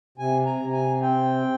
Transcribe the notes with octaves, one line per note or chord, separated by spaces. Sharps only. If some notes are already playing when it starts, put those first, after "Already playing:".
C3 G#5
A#5
C3
G#5
C4 G5